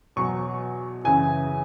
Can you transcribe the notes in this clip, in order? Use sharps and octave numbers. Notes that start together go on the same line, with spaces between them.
E2 B2 F#3 C#6
F#2 C#3 E3 G#5